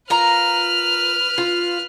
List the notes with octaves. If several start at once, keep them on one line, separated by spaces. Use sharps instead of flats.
F4 A#4 B4 A#5 F6
F4